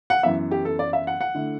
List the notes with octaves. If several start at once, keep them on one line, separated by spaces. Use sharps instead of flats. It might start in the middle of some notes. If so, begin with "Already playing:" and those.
F#5
F#2 E3 B3 E5
G4
A4
D5
E5
F#5
F#5
D3 A3 E4